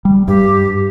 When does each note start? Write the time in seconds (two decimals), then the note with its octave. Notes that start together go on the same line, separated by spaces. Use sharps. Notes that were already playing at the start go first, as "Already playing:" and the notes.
0.05 G3
0.28 G2 G4